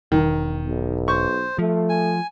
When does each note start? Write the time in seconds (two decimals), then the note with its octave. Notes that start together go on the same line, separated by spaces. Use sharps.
0.12 E1 D#3
0.67 B1
1.08 C5 C#6
1.58 F3 A3
1.89 G#5